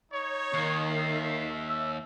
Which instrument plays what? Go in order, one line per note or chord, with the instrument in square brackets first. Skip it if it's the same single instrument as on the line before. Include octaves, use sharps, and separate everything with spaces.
[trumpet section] D#4 C#5
[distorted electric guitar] D#2 [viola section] D#3 [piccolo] C7
[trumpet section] E5
[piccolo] E6